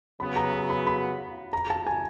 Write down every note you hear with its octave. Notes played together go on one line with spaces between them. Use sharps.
C#3 F#3 B3 B5
A#5
A#5
B5
B5
A#5
A5
G#5